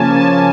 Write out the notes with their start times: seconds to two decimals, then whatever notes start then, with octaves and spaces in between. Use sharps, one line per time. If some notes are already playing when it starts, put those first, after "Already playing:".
Already playing: C#3 F3 A#3 C#4 G#5 A5
0.19 A5